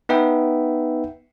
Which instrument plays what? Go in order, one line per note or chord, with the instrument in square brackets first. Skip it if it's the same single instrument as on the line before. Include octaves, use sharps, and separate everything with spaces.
[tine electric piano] B3 D#4 B4 E5 G5